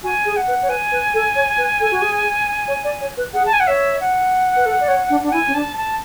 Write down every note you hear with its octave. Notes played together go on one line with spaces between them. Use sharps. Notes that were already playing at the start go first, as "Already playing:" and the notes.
F#4 G#5
G#4
F#5
B4
C#5
B4 G#5
B4
A4
C#5
B4
A4
F#4
G#4
C#5
D5
C#5
B4
G#4 F#5
A5
G#5
F#5
C#5 E5
F#5
B4
A4
D5
C#5
D4
D4
F#5
E4 G#5
C#4
D4 A5
A5